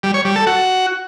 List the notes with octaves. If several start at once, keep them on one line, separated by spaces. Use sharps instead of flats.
G3
C#5
G3
A4
F#4